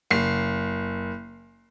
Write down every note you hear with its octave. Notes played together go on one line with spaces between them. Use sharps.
F#1 C7